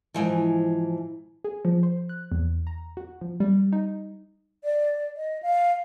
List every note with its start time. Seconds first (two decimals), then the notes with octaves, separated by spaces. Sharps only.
0.14 G#2 E3 F3
1.44 G#4
1.65 F3
1.83 C5
2.09 F#6
2.32 E2
2.67 A#5
2.97 F#4
3.21 F3
3.40 G3
3.73 D#4
4.64 D5
5.16 D#5
5.42 F5